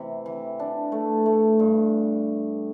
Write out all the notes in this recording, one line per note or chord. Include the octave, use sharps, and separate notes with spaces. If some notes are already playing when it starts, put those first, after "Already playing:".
Already playing: C3 E3
E3
D4
A3
A3
G2